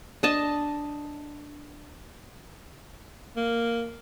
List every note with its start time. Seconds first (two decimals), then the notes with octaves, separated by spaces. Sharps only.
0.23 D4 D#5 A5
3.36 A#3